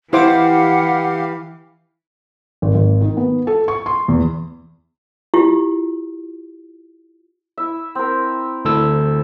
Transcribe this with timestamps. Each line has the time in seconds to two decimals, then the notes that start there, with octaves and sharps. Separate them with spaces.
0.13 E3 E4 G4 C5 F5 F#5 D6
2.62 G#1
2.75 G#1
3.01 D#3
3.17 B3
3.47 A4
3.68 C#6
3.86 C6
4.08 E2
5.34 E4 F4 G4
7.58 E4 E5
7.95 C4 A#4
8.65 D2 E4 A4 E6